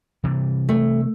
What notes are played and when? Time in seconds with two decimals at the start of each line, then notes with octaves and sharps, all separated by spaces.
0.24 C3 E3 G3
0.69 A3